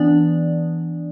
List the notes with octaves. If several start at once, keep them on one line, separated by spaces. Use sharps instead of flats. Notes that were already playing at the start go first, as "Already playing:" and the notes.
Already playing: E3 B3 D4 D5